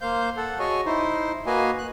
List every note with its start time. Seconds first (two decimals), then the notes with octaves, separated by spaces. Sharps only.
0.01 A#3 C5 F5 G6
0.37 A4 F#5
0.59 F#4 G#4 C#5 D#5 G#5 C#6
0.85 D#4 E4 C5
1.46 A#3 F#4 B4 D#5 F5 G#5
1.78 F#6